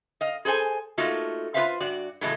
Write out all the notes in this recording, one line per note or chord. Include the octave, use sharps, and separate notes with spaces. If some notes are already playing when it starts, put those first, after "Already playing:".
D#5 F5
G#4 A4 C5 G#5 A5
A3 A#3 D#4 F4 F#4 A4
F4 G4 B4 C5 E5 F5
G2 F#4 D5
A2 C#3 E3 F#3 G#3 A3